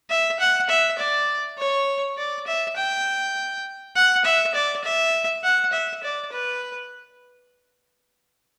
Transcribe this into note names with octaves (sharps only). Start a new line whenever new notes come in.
E5
F#5
E5
D5
C#5
D5
E5
G5
F#5
E5
D5
E5
F#5
E5
D5
B4